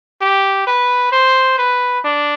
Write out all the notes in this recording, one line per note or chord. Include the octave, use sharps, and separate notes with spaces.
G4
B4
C5
B4
D4